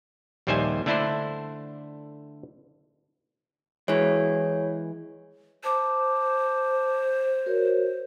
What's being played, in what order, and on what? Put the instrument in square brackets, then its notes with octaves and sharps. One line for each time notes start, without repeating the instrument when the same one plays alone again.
[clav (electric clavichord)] A#1 D#2 G3 C5 E5 G#5
D3 A3 D4 E4 A4 C5
[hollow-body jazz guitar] E3 G#3 [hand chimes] C#5
[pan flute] C5 [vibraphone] A5 D6
[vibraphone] F#4 A#4 C#5